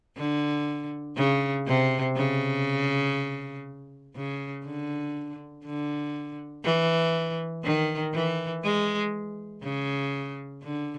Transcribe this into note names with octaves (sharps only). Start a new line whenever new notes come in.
D3
C#3
C3
C#3
C#3
D3
D3
E3
D#3
E3
G#3
C#3
D3